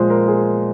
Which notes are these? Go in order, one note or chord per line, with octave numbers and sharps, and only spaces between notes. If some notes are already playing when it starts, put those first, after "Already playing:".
Already playing: A#2 F3 G#3 C5
A#4
G#4